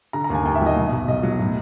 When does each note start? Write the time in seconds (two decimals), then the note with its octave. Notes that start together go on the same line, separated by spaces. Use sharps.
0.13 D3 A#5
0.24 A#5
0.30 D#2 G#5
0.45 D#2 G5
0.55 E5
0.61 F#3
0.66 D#5
0.76 B2
0.92 B1
1.08 B1 D#5
1.23 F#3
1.39 A2